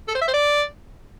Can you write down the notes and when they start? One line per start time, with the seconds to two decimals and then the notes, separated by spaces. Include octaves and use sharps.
0.09 A4
0.15 C5
0.21 E5
0.27 C5
0.34 D5